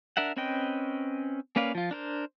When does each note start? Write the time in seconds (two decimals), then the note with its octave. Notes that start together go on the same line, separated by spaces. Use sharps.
0.17 D4 A#4 E5 F#5
0.37 C4 C#4 B4 D#5 G5
1.56 A#3 C#4 B4 D5 F5
1.75 F3 F4
1.91 D4 A#4 C5